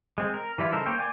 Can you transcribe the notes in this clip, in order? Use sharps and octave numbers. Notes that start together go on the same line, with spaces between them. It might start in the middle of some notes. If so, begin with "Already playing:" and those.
G#3 C4
A#4
E3 G3 E4 F4
C#3 D#4 A4 A#4 C5
A#3 C5 C#5 G5
D5 G5 G#5 C6 D6